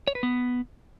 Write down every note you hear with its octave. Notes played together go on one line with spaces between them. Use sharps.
C#5
B4
B3